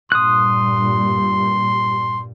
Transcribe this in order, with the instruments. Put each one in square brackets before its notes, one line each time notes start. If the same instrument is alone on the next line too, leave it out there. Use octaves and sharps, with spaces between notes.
[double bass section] G2 A#2 G3 [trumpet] C6 [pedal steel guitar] D#6 F#6